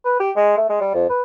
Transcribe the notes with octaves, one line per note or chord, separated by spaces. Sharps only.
B4
G4
G#3
A3
G#3
G3
F2
B4